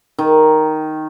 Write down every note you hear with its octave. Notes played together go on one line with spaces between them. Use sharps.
D#3